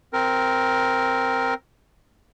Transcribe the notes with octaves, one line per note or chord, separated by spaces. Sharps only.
C4 A#4